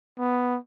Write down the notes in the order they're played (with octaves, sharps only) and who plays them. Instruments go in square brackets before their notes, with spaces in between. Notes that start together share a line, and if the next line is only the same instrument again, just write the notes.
[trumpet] B3